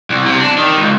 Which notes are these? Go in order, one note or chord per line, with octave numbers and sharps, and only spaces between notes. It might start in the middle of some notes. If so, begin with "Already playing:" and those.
C2
C3
D4
D#3
C#2